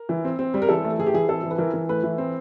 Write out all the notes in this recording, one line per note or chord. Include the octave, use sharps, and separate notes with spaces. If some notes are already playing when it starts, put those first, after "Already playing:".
Already playing: A#4
E3
C4
C4
G3
A#4
E3 A4
A3
E3 G#4
G4
E3 G#4
C4 A4
E3
B4
E3 A#4
E3
A3 B4
E3
C4